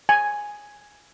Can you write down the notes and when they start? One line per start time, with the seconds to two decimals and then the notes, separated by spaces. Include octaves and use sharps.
0.09 G#5